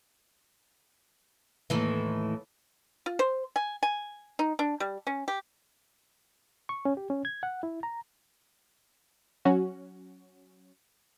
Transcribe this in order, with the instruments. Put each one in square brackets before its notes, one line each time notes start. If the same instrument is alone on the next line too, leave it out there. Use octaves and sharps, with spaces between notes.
[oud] D#2 A2 E3
[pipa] F4
C5
G#5
G#5
D#4
D4
G3
C#4
G4
[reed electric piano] C#6
C#4
G4
C#4
G#6
F#5
E4
A#5
[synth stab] F#3 C#4 F#4